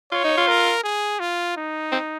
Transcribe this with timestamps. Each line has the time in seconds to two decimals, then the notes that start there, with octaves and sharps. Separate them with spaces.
0.12 F4 C#5
0.24 D#4
0.37 F4
0.48 A#4
0.84 G#4
1.20 F4
1.57 D#4
1.92 C4